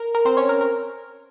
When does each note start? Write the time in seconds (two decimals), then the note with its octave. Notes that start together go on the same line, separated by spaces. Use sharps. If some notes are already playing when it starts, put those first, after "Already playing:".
Already playing: A#4
0.15 A#4
0.25 C4 C5
0.37 C#4 C#5
0.49 A#4
0.61 A#4